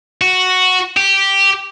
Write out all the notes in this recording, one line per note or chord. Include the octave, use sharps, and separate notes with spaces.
F#4
G4